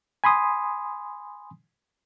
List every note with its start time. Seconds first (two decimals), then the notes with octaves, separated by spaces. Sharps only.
0.24 G#5 B5 C6 D#6